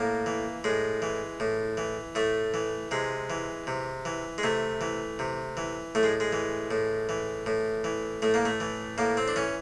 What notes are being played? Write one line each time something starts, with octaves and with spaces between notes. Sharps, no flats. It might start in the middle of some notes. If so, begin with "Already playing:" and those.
Already playing: A2 A#3
E3
A2 G#3
E3
A2
E3
A2 A3
E3
C3 G#3
E3
C3
E3
G#3
C3 A3
E3
C3
E3
A2 A3
G#3
G#3
E3
A2
E3
A2
E3
A2 A3
A#3
A3
E3
A2 A#3
C4
D4
E3 C#4